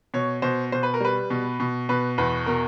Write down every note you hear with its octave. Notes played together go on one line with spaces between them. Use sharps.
B2 C#5
B2 C5
B2 C5
B4
A#4
G3 B4
B2
B2
B2 B4
E2 B4
B2 A#4